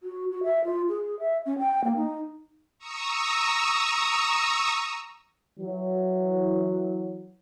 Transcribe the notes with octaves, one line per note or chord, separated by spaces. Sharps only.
F#4
F#4
E5
F4
G#4
E5
C#4
G5
A#3
D#4
A#5 C#6 D#6 E6
E3 F#3